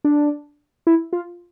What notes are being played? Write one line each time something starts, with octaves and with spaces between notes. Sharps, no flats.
D4
E4
F4